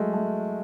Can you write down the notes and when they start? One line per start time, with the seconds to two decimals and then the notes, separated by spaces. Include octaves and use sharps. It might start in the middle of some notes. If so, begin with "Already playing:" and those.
Already playing: F#3 G#3 A3
0.14 A3